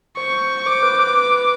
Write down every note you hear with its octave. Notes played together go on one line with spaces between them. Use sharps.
C5 C#6
C5 D6
B4
B4
B4